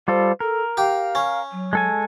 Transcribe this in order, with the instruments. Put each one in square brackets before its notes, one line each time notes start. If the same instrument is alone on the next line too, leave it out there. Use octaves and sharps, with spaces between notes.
[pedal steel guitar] G3 F4 A4 [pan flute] C5
[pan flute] A4 [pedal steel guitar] A#4
[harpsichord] G4 [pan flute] F5
[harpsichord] C#4
[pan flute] F#3
[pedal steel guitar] G#3 A4 G#5